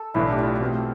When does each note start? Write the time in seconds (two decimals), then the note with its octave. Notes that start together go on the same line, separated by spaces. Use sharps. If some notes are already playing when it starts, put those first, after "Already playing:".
Already playing: A4
0.14 B1 A2 E3 A3 D4 E4
0.32 G4
0.38 F4
0.61 B2 A3 C4